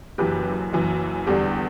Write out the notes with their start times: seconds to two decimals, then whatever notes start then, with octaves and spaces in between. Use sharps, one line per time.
0.18 F#1 F#2 E3 G4 B4
0.73 F#1 F#2 E3
1.27 E2 D3 G3 G4